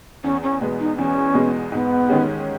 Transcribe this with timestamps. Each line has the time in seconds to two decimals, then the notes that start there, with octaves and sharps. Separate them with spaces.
0.24 E2 C#4
0.43 C#4
0.61 B2 G#3 B3
0.80 D#4
0.98 E2 C#4
1.34 B2 G#3 B3
1.72 G#2 B3
2.08 D#3 G#3 C#4 G4